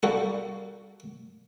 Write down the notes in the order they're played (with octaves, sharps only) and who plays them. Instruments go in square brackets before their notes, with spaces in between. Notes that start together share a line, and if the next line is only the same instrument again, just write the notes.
[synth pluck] G3 [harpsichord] A#3 F#4 A4